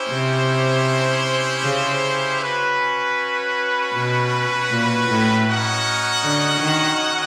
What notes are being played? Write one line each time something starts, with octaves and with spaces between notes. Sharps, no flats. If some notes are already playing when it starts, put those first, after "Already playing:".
Already playing: C#4 E4 G4 C5
C3
C#3
C#4 F#4 B4
B2
A#2
A2
C#4 F#4 A#4 D#5 F#5
D3
D#3